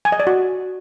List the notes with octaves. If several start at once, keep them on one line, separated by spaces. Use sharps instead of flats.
G#5
D#5
D5
F#4